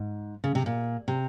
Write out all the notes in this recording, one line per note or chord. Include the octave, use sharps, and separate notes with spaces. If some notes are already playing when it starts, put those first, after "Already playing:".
Already playing: G#2
C#3
C3
A#2
C3